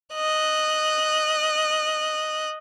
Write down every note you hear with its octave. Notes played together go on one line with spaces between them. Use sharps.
D#5 F#6